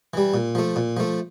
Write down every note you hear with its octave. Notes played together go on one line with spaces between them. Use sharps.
E3 G3
A#2
F3 A3
A#2
F3 A3